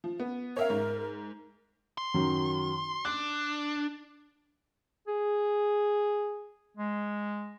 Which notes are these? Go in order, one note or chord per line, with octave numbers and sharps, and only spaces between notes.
F3
B3
A#4 C#5 E5 F5
G#2
C6
F#2 D#3 F#3
D4 F#6
G#4
G#3